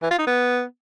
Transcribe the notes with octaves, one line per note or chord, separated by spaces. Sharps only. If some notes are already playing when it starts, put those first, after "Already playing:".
E3
F4
D#4
B3